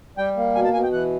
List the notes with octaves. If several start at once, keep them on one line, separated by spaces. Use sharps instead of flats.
G3 G5
A#3
B2 G#5
A5
B2 G#5
G5
E3 F#5